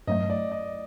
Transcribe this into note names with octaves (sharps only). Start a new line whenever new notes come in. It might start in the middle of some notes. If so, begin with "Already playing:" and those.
G2 F#3 A3 D#5
D5
D#5